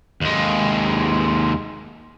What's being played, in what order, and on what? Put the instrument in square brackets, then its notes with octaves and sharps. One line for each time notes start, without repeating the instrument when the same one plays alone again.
[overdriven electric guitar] D#2 G#3